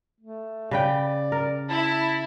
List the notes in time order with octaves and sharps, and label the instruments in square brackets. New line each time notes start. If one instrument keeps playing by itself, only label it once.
[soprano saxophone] A3
[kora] C#3 B4 G5 [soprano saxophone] D5
[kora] A#4
[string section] E4 [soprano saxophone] A5